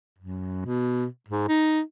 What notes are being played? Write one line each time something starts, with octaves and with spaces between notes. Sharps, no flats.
F#2
B2
G#2
D#4